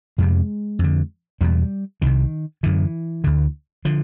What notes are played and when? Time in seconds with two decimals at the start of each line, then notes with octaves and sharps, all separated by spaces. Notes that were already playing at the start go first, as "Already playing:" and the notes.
0.18 F2 C3 G#3
0.79 F2 D3
1.41 E2 B2 G3
2.02 C2 C3 D#3
2.63 F#2 D3 E3
3.24 D2 D3
3.85 D3 F3